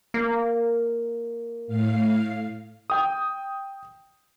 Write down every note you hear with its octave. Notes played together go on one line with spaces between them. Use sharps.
A#3
A2 F5
G5 D#6